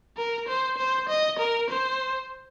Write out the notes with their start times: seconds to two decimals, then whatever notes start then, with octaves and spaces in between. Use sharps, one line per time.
0.17 A#4
0.48 C5
0.77 C5
1.09 D#5
1.39 A#4
1.70 C5